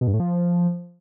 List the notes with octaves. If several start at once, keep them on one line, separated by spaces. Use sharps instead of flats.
B2
G2
A2
F3